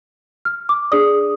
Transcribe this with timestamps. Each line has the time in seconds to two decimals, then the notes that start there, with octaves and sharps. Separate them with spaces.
0.45 F6
0.69 D6
0.92 D4 G#4 D5 D#6